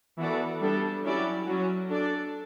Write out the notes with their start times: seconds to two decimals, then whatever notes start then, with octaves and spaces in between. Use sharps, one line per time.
0.18 E3 B3 F#4 A4 D5
0.60 G3 B3 D4 A4
1.04 F#3 C#4 E4 G4 D5
1.46 F#3 C#4 F#4
1.89 D4 A4 D5